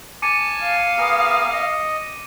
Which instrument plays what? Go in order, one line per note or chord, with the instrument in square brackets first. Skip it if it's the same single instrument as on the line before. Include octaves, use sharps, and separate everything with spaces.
[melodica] G#5 A5 [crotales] D6 C#7 D#7
[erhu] F5
[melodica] B3 G#4 A#4
D#5